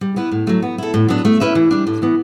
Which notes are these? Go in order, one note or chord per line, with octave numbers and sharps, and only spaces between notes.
G3
B3 E4 B4
A2
F#3 A3
B3
E4 A4
A2
F#3 B3 D4
A3
C#4 E4 B4 E5
E3
G3 D4
A2
E3 B3